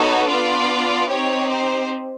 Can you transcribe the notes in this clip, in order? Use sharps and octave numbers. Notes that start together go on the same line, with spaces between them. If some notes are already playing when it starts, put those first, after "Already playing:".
Already playing: B3 D#4 F#4 A4 C#5
B3 D4 F4 D5
C4 D#4 G4 C#5
C5